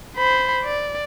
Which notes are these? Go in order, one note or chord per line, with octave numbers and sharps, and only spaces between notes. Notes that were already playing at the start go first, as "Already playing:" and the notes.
C5 B5
D5